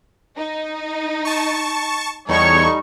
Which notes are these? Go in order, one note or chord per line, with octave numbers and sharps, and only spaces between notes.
D#4
A5 C#6
E2 G3 D#4 A4 C#5 C#6